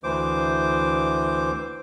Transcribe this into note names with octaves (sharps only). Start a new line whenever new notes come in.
D2 E3 C5 D6